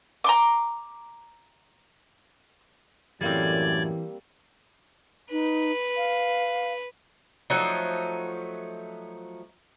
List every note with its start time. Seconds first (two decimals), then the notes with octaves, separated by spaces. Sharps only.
0.24 A#5 C6 D6
3.21 F#2 A2 E3 G3 A#3 C4 D5 G#6
5.32 D#4 B4
5.97 F5
7.50 F3 F#3 A3 D#4